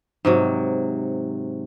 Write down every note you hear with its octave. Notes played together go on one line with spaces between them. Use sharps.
G#2 C3 F#3